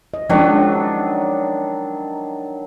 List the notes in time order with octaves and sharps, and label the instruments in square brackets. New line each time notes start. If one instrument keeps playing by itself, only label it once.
[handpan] D#5
[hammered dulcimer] D#3 F#3 D4 [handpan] F3 G#3 C#4